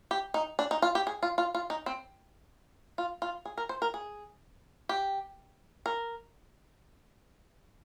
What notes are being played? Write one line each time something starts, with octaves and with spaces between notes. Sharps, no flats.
G4
D#4
D4
D#4
F4
G4
G#4
F4
F4
F4
D#4
C4
F4
F4
G#4
A#4
C5
A#4
G#4
G4
A#4